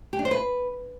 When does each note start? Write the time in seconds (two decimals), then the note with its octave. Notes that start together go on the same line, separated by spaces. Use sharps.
0.13 G4
0.19 D4
0.25 C5
0.31 B4